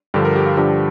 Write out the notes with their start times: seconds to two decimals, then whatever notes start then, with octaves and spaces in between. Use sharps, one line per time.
0.14 G2 D3 F3 G4
0.25 A#4
0.36 G4
0.46 F4
0.57 G2 D3 F3 G4